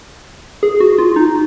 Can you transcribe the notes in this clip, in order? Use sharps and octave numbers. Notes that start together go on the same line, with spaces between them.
G#4
F#4
F4
D#4